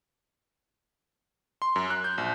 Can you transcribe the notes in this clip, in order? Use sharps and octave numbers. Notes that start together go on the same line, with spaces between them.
C6
F#2
F#6
G6
A#1